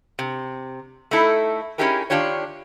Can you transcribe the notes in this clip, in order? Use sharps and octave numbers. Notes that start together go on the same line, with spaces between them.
C3
A3 D#4 E4 A4
C#4 D#4 E4 G4 G#4 A#4
D#3 D4 F4 G4 C#5